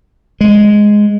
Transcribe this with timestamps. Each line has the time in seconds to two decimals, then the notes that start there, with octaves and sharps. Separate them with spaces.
0.41 G#3